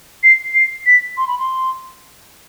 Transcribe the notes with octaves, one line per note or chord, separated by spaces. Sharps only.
C7
C7
B6
C6
B5
C6